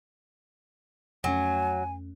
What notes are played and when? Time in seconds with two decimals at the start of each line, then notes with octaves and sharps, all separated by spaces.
1.24 F2 F#3 A3 C#4 G#5